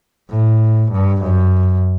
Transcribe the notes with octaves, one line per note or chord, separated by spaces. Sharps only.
A2
G2
F#2